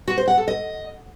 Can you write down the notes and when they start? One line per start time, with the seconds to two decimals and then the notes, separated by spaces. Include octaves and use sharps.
0.08 F#4
0.18 C5
0.28 F#5
0.38 A4
0.48 D#5